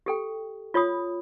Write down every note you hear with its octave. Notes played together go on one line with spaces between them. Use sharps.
G4 A4 G5
F4 C#5 B5 D#6